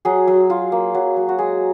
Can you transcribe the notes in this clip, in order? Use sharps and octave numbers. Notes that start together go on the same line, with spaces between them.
F#3 G#4
F#3
F4
A#3
F#3
F#3
F#4
G#3 G#4